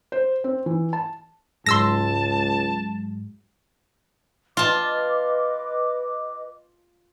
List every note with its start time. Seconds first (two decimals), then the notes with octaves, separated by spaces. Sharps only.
0.12 C5
0.44 C4
0.66 E3
0.93 A5
1.66 C#2 G#2 F#3 G#3 A5 C6 E6 A#6
4.57 F4 B4 D#5 A5 D6